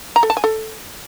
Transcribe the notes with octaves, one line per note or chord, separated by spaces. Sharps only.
A#5
A4
A5
G#5
A4